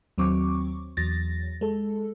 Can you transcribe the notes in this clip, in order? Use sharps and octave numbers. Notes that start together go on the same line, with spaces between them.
D#2 F#3 C4 C#6 D6
E2 F#3 A6 A#6
G#3 A4